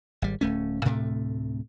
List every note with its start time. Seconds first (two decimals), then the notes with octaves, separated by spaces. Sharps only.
0.22 G#1 G3
0.41 D1 A3 C#4
0.84 D2 A2 C3 A3